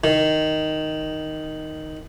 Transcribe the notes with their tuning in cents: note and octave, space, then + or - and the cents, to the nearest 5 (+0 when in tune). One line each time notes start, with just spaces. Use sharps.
D#3 +0